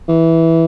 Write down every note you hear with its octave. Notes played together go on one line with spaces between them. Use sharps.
E3